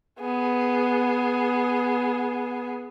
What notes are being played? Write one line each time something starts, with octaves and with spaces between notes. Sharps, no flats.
B3 G#4